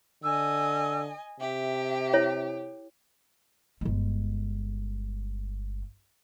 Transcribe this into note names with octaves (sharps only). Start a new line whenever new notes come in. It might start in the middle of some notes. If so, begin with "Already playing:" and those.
D3 D#5 G#5 E6
C3 G4 E5
E4 C#5
G1 G#3